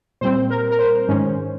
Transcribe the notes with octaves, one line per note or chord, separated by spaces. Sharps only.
A#2 G3 C4 C5
A#4
A#4
C5
G#2 D#3 G#3 C#4